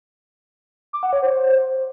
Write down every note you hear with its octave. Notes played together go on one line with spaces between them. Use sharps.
D6
F#5
C#5
C5